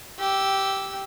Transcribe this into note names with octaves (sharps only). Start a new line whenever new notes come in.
G4 E6